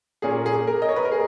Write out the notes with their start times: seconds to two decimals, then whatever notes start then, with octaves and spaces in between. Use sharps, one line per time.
0.22 A#2 A#3 C#4 G#4
0.46 G#4
0.67 A#4
0.82 D#5
0.89 C#5
0.96 B4
1.05 A#4
1.12 G#4